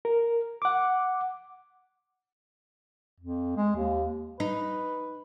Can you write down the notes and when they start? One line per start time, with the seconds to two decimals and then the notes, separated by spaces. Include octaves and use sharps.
0.05 A#4
0.62 F#5 D6
3.20 F2
3.57 G#3
3.75 D#2
4.40 D#4 B4